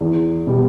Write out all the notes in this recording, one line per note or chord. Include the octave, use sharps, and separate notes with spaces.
E2
B2 G3